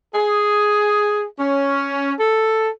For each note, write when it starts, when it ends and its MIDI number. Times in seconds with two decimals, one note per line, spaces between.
0.13 1.24 68
1.39 2.13 61
2.19 2.70 69